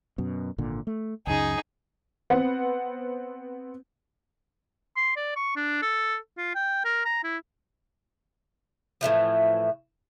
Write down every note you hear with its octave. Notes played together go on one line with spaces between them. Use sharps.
F#2 B2
G#1 A#2 D3
A3
C#2 F#2 C#3 D#4 G#4
B3 C4 F#5
C6
D5
C#6
D4
A4
F4
G5
A#4
A#5
E4
A2 D3 E3 F3